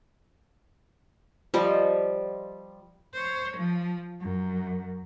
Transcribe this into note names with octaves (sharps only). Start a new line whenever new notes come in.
F3 G3 D#5
C5 C#5
F3
F#2